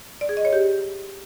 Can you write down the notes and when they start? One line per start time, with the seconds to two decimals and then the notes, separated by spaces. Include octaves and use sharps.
0.21 D5
0.29 G#4
0.37 D#5
0.45 C#5
0.53 G4